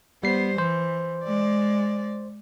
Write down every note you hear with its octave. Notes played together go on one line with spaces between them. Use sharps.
G3 B3 C5 C7
E3 C5
G#3 D5